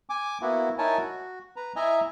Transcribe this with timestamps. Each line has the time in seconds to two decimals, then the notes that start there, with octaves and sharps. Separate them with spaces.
0.10 G#5 D6
0.42 A#3 B3 E4 F#4
0.78 D#4 E4 A#4 C#5 G#5 A5
0.98 F#4
1.56 B4 A#5
1.76 E4 D#5 E5 G#5 A#5